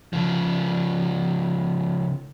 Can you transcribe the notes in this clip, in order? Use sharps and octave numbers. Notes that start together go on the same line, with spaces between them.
C#3 F3